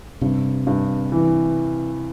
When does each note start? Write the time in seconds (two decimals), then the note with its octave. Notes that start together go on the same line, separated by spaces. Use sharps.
0.21 G2 C3
0.67 G2
1.12 E3